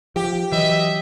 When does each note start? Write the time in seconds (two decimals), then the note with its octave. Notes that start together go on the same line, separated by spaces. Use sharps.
0.16 F3 G4
0.52 E3 F#3 D#5 E5